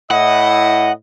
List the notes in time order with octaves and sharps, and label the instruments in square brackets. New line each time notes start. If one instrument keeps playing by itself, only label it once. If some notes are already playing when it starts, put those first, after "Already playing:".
[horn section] A2 E4 D#5 [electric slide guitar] F#5